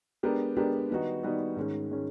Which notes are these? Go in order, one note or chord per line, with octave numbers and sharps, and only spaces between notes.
G#3 B3 D4 G4 A#4
G#3 B3 D4 G4 A#4
D#3 G3 B3 D#4 F#4
D#3 G3 B3 D#4 F#4
G#2 D#3 G#3 C#4
D#3 G#3 C#4